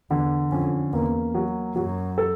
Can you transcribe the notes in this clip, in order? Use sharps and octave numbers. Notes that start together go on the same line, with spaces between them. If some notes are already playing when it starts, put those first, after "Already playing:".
E2 D3
F2 C#4
E2 A#3
F#3
F#2 F#3
A4